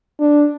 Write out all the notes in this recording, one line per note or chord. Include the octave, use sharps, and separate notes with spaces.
D4